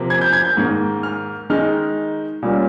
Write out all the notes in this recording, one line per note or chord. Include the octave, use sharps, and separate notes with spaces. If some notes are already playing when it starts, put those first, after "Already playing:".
Already playing: C3 F3 A#3
G#6
G6
G#6
G6
G#2 D#3 A#3
F6
D#3 G#3 D#4 F6
A#2 G3 A#3 C#4